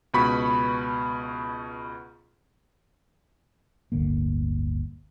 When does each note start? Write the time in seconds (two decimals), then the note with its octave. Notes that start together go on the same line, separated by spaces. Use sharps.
0.14 C#2 B2 B5 C#6 B6
3.92 D1 G1 D3 A#3